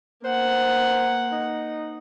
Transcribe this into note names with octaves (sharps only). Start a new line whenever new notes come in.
A#3 C5 F#5
D#4